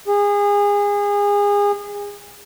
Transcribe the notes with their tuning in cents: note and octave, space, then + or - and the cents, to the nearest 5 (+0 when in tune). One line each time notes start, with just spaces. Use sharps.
G#4 -30